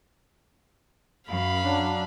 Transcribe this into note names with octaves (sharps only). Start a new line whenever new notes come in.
F#2 F5 B5
F#3 D4